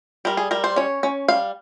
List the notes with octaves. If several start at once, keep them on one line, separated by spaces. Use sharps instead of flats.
G3 A#4
G#4
G3 A#4
C5
C#4 C#5
C#4
G3 F5